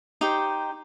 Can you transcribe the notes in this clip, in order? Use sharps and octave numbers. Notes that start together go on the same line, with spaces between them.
D#4 G4 C5